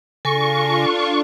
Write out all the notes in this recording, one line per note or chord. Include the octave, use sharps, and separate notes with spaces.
C#3 D4 F4 A4 G#5 C#6 A#6